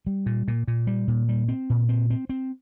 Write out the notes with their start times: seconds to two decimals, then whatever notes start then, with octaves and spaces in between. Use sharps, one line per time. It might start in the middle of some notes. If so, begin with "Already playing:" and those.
0.06 G3
0.26 A#2
0.48 A#2
0.68 A#2
0.87 G3
1.08 A#2
1.29 G3
1.48 C4
1.70 A#2
1.89 C4
2.10 C4
2.29 C4